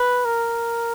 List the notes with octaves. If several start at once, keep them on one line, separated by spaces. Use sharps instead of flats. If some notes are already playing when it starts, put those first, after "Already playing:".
Already playing: B4
A#4